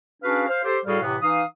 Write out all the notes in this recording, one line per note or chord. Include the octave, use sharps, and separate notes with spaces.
C#4 D4 F#4 G#4 B4 F5
C5 F5
G4 A4 C5
A2 G3 F#4 G#4 A4 F5
A2 C3 E3 B3
E3 D#4 F5 D#6